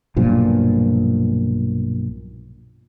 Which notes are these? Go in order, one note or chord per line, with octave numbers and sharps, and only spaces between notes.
B1 G2 A#2 F3